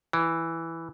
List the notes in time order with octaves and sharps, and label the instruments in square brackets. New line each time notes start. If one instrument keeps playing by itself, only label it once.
[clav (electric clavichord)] E3